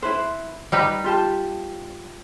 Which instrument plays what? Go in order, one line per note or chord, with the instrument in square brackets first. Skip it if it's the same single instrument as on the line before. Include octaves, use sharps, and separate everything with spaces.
[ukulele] E4 B4 C5
[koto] G3 D#4 B4 [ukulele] G5
[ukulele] F4 G4 A5